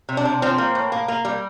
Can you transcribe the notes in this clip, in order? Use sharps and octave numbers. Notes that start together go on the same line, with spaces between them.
C3
D4
C3
F3 C4
A#3
A2
A#3
A#3
G3